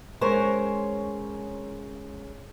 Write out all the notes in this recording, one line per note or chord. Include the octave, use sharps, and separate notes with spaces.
G#3 C#4 A#4 C5 C#5